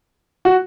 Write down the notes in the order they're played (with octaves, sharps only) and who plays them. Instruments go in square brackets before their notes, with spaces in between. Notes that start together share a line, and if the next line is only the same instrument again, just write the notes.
[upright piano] F#4